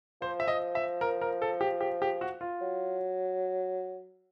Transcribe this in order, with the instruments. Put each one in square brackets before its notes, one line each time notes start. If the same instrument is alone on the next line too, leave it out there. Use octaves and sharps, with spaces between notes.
[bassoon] F3 [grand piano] C5
[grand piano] E5
D#5
E5
A#4
A#4
A4
G4
G4
G4
F#4
F4
[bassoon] F#3